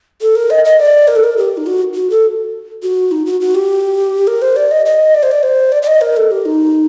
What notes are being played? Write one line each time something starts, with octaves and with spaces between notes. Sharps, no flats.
A4
A#4
D#5
D#5
D5
A#4
A4
A#4
G4
D#4
F#4
F#4
A4
F#4
D#4
F#4
F#4
G4
A#4
C5
D5
D#5
D#5
D5
C5
D5
C5
D5
D5
D#5
A#4
A4
G4
D#4